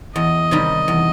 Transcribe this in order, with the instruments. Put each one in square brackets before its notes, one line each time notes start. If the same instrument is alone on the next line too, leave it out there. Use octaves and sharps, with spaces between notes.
[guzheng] E2 [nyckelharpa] D#5
[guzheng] C3 D#3 G3 D#4
E2